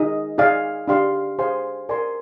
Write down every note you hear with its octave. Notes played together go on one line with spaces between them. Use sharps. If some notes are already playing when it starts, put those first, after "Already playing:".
Already playing: D#4 G#4 D#5
D#4 G#4 D5 F5 G#5
D4 G4 D5 F5 C6
G#4 C5 F5 G#5 C6
A#4 D5 G#5 C6